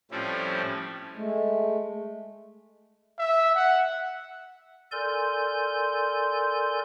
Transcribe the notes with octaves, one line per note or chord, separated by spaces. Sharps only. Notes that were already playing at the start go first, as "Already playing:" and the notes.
A2 F3 G3 C4 C#4 E4
G#3 A3
E5
F#5
A4 A#4 D5 G#5 C6 G6